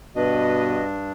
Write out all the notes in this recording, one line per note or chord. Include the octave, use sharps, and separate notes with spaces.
G2 B2 D4 F#4 B4 D#5